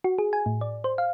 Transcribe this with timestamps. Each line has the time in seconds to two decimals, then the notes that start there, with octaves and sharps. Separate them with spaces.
0.04 F#4
0.18 G#4
0.33 G#5
0.46 A2
0.61 D5
0.84 C5
0.98 F5